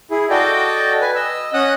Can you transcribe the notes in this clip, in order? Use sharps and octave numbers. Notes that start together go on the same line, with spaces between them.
E4 G#4
F#4 A4 D5 D#5 G5
B4 G#5
D#5 E6
C#4 D#5 F#5 D#6 F#6